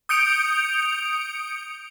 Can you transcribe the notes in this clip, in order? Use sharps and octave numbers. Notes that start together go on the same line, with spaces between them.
D#6 G6 C#7 D7 F7